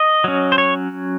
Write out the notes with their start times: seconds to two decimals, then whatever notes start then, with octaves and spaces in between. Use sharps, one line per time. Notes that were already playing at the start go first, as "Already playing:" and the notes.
Already playing: D#5
0.24 F#3 C#4
0.52 C5
0.58 C#5